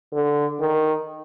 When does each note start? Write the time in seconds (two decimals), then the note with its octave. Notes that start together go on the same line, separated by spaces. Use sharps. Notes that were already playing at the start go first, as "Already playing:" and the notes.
0.13 D3
0.60 D#3